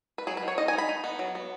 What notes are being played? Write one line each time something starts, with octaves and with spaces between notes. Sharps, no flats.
B4
F#3 G#4
B4
D#4 C#5
D#4 D#5
G#5
D#4
B5
D#4
B3
F#3
B3